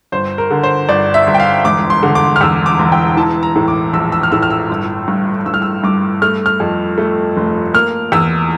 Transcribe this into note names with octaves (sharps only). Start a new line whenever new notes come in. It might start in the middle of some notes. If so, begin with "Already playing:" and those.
G1 C5
A#4
D3
C5
G1 D5
E5
G1
G5
F5
E1 D6
C6
D3
D6
F6
E2 E6
D6
E1
G5
E3 A5
A#5
A2
D6
A#1 E6
E6
F6
A2 E6
F6
E6
G1
G2
G2 E6
F6
E6
G2 D6
A3 F6
F6
F2
A3
F1
A#3 F6
E2 E6